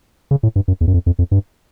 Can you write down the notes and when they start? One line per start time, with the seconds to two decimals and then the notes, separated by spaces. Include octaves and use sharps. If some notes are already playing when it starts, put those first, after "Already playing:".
0.31 C#3
0.43 A2
0.56 G2
0.68 F#2
0.81 E2
0.87 F#2
0.94 F2
1.06 F2
1.19 F2
1.31 G2